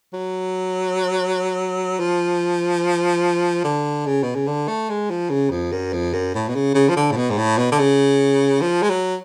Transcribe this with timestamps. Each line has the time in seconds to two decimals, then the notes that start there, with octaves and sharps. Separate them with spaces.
0.13 F#3
1.99 F3
3.64 D3
4.06 C#3
4.23 B2
4.35 C#3
4.47 D3
4.68 A3
4.90 G#3
5.10 F3
5.30 C#3
5.51 F2
5.72 F#2
5.93 F2
6.13 F#2
6.34 A2
6.48 B2
6.55 C#3
6.75 C#3
6.89 F3
6.97 D3
7.12 A2
7.17 B2
7.30 G#2
7.38 A2
7.58 B2
7.72 D3
7.79 C#3
8.62 F3
8.82 G#3
8.90 F#3